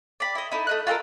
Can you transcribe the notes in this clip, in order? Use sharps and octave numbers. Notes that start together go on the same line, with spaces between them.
D5 B5
E4 D#5
D#4 E4 A4
A3 D#5 F#6
F4 F#4 A4 A#4